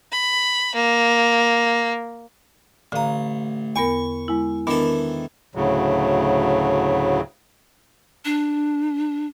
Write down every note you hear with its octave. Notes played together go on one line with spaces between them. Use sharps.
B5
A#3
A1 D3 F5 A#5 D#6
E2 B3 A#4 C#6
G#3 E4
D#3 E3 B3 D4 A4 A#4
D2 A2 C#3 F#3
D4